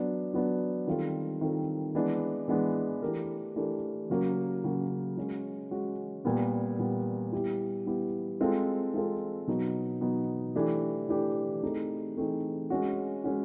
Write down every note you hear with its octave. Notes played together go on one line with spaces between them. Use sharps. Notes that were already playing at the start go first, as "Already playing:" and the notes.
Already playing: F#3 B3 D4
F#3 B3 D4
D#3 G3 C4 F4 A4
D#3 G3 C4 F4 A4
E3 G#3 B3 D4
E3 G#3 B3 D4
E3 A3 D4 G4 A#4
E3 A3 D4 G4 A#4
C#3 F#3 A#3
C#3 F#3 A#3
G#3 C#4 F#4
G#3 C#4 F#4
A#2 G3 B3
A#2 G3 B3
G3 B3 E4 G4
G3 B3 E4 G4
G#3 C4 F4 A4
G#3 C4 F4 A4
B2 F#3 B3 D#4
B2 F#3 B3 D#4
E3 A3 D4 G4
E3 A3 D4 G4
E3 A3 C4 D#4 G#4
E3 A3 C4 D#4 G#4
G#3 C#4 F#4
G#3 C#4 F#4